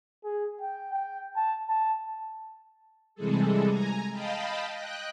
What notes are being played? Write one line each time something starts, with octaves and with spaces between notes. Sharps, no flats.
G#4
G5
G5
A5
A5
C3 E3 G3 G#3 G#4 A4
G#5 A#5
D#5 F5 G5 A5 B5
D#5 G5 F#6